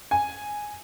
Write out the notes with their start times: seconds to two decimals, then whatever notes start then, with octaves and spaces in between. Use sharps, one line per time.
0.11 G#5